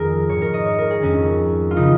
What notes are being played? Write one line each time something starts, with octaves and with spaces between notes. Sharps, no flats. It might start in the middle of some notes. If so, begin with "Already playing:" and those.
Already playing: F2 D#3 G#4 A#4
G#2 D#3 C#5
A#4
D#5
C#5
A#4
G#4
F2 D#3 C#4
F4
C#3 F3 D#4